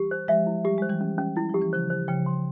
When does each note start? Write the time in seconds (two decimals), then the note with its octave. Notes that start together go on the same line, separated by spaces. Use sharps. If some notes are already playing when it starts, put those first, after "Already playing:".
Already playing: E3 G3 G4
0.11 C5
0.28 F3 G#3 E5
0.47 E4
0.65 G3 G4
0.78 G#3 C5
0.89 E3 G3
1.01 C#4
1.18 C#4
1.36 G3 E4
1.50 F3 G4
1.61 E3
1.73 C#3 F3 C5
1.90 C5
2.08 C#3 F3 G5
2.26 C6